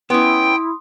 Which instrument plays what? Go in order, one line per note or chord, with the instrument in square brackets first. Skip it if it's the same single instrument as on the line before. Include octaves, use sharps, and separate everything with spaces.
[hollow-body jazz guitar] B3 C#4 [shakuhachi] E4 [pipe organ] G5 [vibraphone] C6 D#6